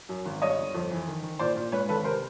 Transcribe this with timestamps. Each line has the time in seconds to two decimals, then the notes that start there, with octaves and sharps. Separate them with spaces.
0.09 F#2
0.25 G#1
0.42 G2 C#5 D#5
0.58 G1
0.74 F2
0.91 E3
1.08 D#3
1.23 D#3
1.39 A#2 C5 D5
1.56 A#2
1.72 G#2 B4 C#5
1.89 G#1 A4 B4
2.04 C3 A#4 C5